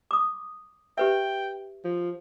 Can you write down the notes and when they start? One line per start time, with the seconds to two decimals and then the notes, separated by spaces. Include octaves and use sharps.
0.11 D6 D#6
0.98 G4 B4 E5 G5
1.84 F3